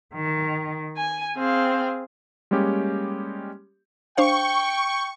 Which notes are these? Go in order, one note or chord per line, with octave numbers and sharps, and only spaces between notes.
D#3
G#5
C4 G#4 F5
G3 G#3 A#3 C#4 G4
D4 C5 F5 G5 C#6